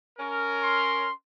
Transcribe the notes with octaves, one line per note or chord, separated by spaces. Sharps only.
C#4 A#4
C6